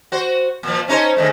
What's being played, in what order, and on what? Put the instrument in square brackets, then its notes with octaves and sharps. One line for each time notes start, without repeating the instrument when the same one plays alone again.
[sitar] F#4 C5
A#2 F3
C#4 D#4 C5
D3 G#3 A3